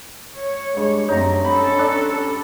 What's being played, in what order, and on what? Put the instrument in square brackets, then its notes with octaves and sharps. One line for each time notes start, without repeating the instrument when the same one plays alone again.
[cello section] C#5
[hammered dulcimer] G2 [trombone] G#3
[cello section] F#2 A3 C4 [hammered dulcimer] D#4 A#5 [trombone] C#5
[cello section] C4 C#4 A4 [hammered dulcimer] B5
[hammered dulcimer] D4